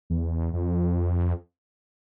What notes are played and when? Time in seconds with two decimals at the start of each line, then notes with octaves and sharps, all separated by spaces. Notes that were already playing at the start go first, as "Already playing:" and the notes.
0.10 E2
0.53 F2